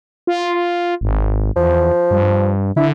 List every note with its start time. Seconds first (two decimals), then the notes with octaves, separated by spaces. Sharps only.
0.27 F4
1.01 G#1
1.56 E2 F3
2.11 G2
2.76 D3 E4